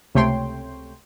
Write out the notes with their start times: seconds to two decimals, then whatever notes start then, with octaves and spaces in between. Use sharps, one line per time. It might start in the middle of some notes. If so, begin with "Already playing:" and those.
0.15 C#2 C3 A3 C#5 G5 C6